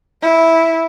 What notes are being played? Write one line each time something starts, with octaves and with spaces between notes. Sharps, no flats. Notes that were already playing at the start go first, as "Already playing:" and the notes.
E4